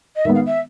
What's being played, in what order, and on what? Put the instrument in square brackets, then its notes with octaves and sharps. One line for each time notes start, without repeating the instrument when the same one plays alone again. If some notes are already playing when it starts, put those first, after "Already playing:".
[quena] D#5
[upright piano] D#3 G#3 B3 [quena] E5
[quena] F5
E5